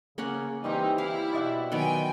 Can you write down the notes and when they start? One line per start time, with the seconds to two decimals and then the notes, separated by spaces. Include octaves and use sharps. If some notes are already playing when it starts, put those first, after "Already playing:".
0.18 C#3 A#3 C#4 F#5
0.64 E3 G3 C4 D#4 G4
0.98 E4 F5
1.33 B2 D5 E5 F#5
1.72 D#3 F#3 B3 G5 G#5